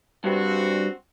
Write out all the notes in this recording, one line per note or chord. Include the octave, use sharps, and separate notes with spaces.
G2 C4 F#4